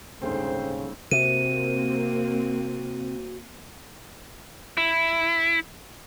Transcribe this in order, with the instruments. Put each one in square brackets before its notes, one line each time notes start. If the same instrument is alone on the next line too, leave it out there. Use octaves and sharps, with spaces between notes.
[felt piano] D#1 D2 G#2 [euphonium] C#3 [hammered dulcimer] C4 [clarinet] C5
[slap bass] C3 [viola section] A#3 C4 [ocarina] F#4 [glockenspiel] D#7
[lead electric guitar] E4